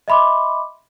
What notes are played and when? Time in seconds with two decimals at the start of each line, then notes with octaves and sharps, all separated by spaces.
0.08 D#5 E5 B5 C6 D6